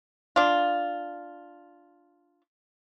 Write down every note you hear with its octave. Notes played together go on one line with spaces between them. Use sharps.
D4 F4